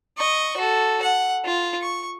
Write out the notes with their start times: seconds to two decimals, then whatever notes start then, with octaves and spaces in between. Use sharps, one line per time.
0.18 D#5 C#6
0.57 F#4 A4
1.02 F#5
1.45 F4
1.81 C#6